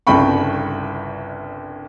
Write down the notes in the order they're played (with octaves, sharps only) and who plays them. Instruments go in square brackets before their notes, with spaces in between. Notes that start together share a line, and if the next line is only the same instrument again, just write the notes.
[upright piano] G1 C2 C#3 G5 B5 C#6